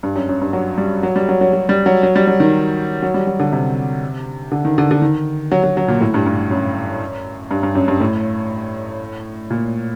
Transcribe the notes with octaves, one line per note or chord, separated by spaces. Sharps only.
G2
F#2
F#2
G2
F#3
G3
F#3
G3
F#3
F#3
F#3
G3
F#3
F#3
G3
F#3
D#3
F#3
G3
F#3
D3
C3
D3
D#3
D3
D3
D#3
F#3
F#3
F#3
A#2
A2
G2
G2
F#2
G2
G2
F#2
G2
A2
A#2